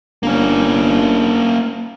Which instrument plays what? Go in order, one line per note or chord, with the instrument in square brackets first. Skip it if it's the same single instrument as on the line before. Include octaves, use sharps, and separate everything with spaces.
[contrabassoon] G1 [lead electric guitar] A#3 C#4